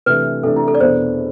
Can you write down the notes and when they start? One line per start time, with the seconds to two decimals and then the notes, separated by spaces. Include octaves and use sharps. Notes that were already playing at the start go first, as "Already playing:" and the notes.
0.06 C3 E3 A3 D4 B4
0.43 C3 E3 A3 D4 A4
0.56 E4
0.68 A4
0.75 D5
0.80 E2 B2 B3 D4 C5